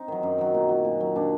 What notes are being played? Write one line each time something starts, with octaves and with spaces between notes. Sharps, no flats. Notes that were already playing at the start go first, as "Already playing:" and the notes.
Already playing: C4 D#4
D#3 F#3
F#2
D#3 F#3
A#2
F#3
A#2
F#3
A#2 D4